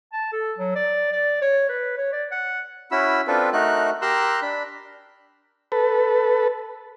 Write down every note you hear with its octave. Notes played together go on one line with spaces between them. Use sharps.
A5
A4
F#3
D5
D5
C#5
B4
C#5
D5
F#5
C#4 E4 F#4 B5 E6
C4 D4 F4 A4 B4
A3 D#4 F#4 A#4 F#6
G4 A#4 A#5 C6 E6 F#6
D4 B5
A4 B4